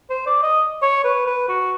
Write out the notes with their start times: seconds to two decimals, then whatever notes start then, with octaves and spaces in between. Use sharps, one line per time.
0.10 C5
0.26 D5
0.43 D#5
0.82 C#5
1.04 B4
1.26 B4
1.49 F#4